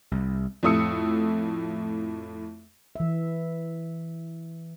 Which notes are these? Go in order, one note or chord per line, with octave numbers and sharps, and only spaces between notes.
C2
F2 A2 A3 D#6 E6 C#7
E3 E5